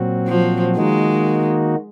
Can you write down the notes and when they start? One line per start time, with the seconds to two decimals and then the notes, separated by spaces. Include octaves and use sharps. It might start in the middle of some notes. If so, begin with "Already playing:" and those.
Already playing: A#2 F#3 C4 F#4
0.27 F3
0.77 D#3 G#3 A#3 D#4 F#4